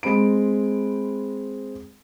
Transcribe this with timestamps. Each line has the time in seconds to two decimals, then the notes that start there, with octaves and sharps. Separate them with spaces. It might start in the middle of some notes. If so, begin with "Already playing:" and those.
0.03 G#3 C4 B5 D7